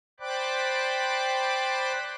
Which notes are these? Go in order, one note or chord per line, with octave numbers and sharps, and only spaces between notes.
C5 D5 G5 B5 D6 F#6